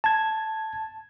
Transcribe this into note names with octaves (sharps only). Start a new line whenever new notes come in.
A5 G#6